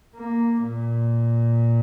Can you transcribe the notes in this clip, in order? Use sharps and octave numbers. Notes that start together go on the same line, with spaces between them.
A#3
A#2